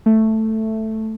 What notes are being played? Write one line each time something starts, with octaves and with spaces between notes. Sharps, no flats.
A3